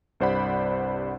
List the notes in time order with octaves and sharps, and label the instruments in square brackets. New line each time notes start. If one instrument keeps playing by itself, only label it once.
[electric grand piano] C2 G2 C5 D5 F#5 B5